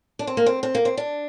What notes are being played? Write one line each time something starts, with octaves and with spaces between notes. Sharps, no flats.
D4
C4
A#3
C4
C4
A#3
C4
D4